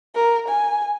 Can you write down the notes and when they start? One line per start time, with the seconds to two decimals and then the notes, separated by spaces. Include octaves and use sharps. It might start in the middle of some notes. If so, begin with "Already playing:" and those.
0.15 A#4
0.48 G#5